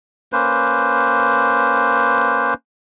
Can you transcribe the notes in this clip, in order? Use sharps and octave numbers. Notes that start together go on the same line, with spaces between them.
A#3 C#4 B4 C5